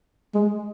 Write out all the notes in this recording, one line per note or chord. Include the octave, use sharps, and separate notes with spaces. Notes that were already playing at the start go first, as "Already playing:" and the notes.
G#3